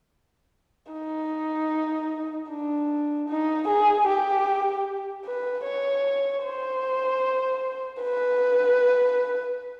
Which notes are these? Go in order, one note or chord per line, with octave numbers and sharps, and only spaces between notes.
D#4
D4
D#4
G#4
G4
B4
C#5
C5
B4